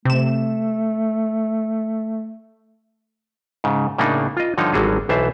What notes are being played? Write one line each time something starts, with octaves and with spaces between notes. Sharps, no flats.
C3 A3 E7
G#2 C#3
A2 C#3 A#3 D4 D#4
F4 D#5
G2 D3 F3 D#4 C#5
G#1 D3 F#3 G3 F#4 G#4
B1 E3 C5 E5 A5